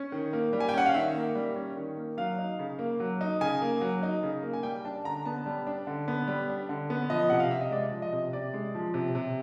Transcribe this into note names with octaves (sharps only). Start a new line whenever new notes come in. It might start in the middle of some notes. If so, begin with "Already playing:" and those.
Already playing: C#4
D#3
A#3
G3
G#5
G5
C#4 F#5
F5
D#3 E5
A#3
G3
C#4
D#3
A#3
F#3 F5
D#4
C#3
A#3
F#3
D#4
C#3 G#5
A#3
F#3
D#4
C#3
A#3
G#5
G3 G5
D4 A5
D3 A#5
B3 A5
G3
D4
D3
B3
G3
D4
D3
B3
F3 D#5
C3 F#5
F5
C3 E5
D#5
G#3 D5
F3
D#5
C3
C3 D5
G#3
F3
C3
C3